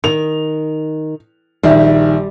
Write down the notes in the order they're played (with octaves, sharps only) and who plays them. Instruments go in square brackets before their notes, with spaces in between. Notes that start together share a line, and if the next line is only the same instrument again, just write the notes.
[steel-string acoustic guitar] D#3 [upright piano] F7
[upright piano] A#1 D#3 E5 [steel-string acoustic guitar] G3